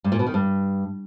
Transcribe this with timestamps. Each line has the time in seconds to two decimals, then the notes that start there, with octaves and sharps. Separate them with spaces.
0.04 G2
0.12 A#2
0.19 B2
0.27 D#3
0.34 G2